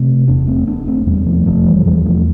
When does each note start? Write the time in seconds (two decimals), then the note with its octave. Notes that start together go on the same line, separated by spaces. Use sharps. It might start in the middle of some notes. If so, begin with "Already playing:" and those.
Already playing: C3 A3 C4
0.28 E1 B3 D4
0.47 A3 C4
0.67 E1 B3 D4
0.87 A3 C4
1.06 E2 G3 B3
1.26 F3 A3
1.46 F1 F3 A3
1.66 E3 G3
1.85 E2 E3 G3
2.05 F3 A3